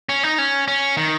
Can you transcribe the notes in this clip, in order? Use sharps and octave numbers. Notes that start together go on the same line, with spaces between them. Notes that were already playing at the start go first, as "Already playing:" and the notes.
C#4
D#4
C#4
C#4
D#3